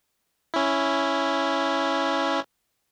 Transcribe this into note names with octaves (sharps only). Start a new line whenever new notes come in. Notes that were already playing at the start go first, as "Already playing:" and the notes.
C#4 E4